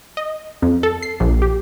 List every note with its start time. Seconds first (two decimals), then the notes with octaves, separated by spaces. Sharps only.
0.17 D#5
0.62 F2
0.83 A4
1.02 C7
1.20 A#1
1.42 G4